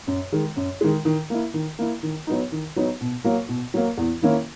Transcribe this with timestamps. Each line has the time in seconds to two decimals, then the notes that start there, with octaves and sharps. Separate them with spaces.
0.07 F#2
0.32 D#3 G#3
0.56 F#2
0.81 D#3 G#3
1.05 D#3
1.30 A#3 E4
1.54 D#3
1.79 A#3 E4
2.03 D#3
2.27 F#3 B3 D#4
2.52 D#3
2.76 F#3 B3 D#4
3.01 B2
3.24 F#3 A#3
3.49 B2
3.74 F#3 A#3
3.97 E2
4.22 D#3 A#3 C#4 E4